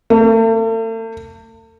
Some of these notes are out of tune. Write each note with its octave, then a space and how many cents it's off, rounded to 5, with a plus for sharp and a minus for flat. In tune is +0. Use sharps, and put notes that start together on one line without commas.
A3 +40